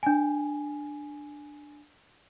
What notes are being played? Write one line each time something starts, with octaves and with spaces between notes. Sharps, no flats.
D4 G#5